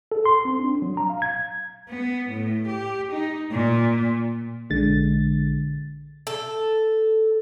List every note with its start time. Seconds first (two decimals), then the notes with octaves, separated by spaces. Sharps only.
0.12 A4
0.26 C6
0.45 C4
0.59 D4
0.82 F#3
0.97 A#5
1.10 F5
1.22 G#6
1.89 B3
2.29 A2
2.67 G4
3.12 D#4
3.51 A#2
4.70 A#1 D3 G#3 A6
6.27 A4